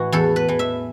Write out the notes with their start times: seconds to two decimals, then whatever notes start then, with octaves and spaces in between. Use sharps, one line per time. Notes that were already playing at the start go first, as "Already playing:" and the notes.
Already playing: A2 E3 E4 F#4
0.12 E2 A4
0.36 B4
0.49 E3
0.59 E5